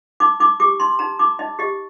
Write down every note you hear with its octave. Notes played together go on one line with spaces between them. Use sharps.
D#4 D6
D#4 D6
G4 D6
D#4 C6
D#4 A#5
D#4 D6
D#4 D#5
G4 D#5